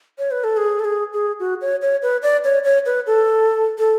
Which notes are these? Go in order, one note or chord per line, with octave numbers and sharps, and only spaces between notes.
C#5
B4
A4
G#4
A4
G#4
G#4
F#4
C#5
C#5
B4
D5
C#5
C#5
B4
A4
A4